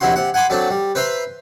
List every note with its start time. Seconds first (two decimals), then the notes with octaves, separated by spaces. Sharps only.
0.01 A#1 D#2 C4 E4 F#4 C6
0.16 C3 F#5
0.34 F#5 G#5 B5 C6 D6
0.50 F#3 A3 C4 D4
0.70 G3
0.95 B4 C5 E5 A#5 C6